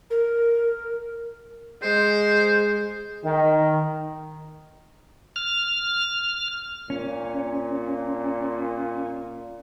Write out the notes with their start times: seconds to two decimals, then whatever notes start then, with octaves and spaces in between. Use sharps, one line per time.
0.10 A#4
1.83 G#3 C5
3.23 D#3
5.36 F6
6.90 A#2 C#4